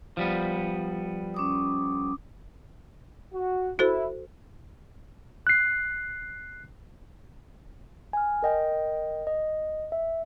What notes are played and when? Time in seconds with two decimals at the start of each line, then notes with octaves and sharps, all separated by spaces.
0.17 F3 G3 B3
1.34 C#4 D6 D#6
3.34 F#4
3.79 E4 F#4 A4 C5
5.47 F#6 C7
8.13 G#5 F6
8.43 A#4 D#5 G5
9.27 D#5
9.92 E5